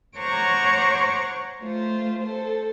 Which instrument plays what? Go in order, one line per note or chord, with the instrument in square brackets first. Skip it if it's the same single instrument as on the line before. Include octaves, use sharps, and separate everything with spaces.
[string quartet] C5 C#5 F#5 A#5 C#6 D6
A3 F4 C5
A4 C5